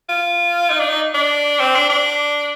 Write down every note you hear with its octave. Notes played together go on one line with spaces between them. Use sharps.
F4
D#4
D4
D#4
D4
C4
D4
D4